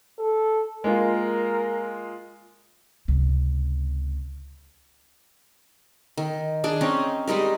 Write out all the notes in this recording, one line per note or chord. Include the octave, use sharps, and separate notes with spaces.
A4
G#3 A#3 F4 A#4
C#2 C3
D#3
D4 G#4
C4 C#4 D#4
G3 G#3 D#4 A#4